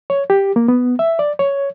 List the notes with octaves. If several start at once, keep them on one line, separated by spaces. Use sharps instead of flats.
C#5
G4
A#3
B3
E5
D5
C#5